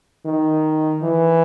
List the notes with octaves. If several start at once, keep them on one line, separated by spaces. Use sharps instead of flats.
D#3
E3